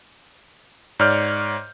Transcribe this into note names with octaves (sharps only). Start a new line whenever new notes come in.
G#2 C#5 D5 F6 G6